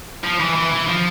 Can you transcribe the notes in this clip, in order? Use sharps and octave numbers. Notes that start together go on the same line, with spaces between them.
F3
E3
E3
E3
F3